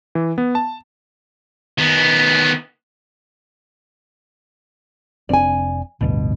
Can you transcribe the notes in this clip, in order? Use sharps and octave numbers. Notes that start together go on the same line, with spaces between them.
E3
B3
A5
D#3 B3
F1 C4 D4 D5 G#5
A1 D2 G2 B2